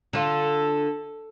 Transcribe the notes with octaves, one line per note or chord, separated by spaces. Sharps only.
D3 F4 A4